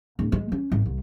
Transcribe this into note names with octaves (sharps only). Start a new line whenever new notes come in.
D1
G#3
C#4
G#1
C2